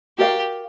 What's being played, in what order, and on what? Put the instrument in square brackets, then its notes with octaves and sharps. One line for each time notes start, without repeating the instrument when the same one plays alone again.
[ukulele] F#4 A#4 D5 F5 [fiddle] G4